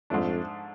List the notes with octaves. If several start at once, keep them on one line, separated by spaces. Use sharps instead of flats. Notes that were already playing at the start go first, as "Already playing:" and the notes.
F2 G#2 F3 A3 D4